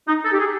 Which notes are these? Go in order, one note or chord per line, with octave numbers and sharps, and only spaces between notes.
D#4
A4
G4
G#4